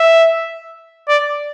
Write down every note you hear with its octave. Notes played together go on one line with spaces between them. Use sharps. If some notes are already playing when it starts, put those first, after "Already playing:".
Already playing: E5
D5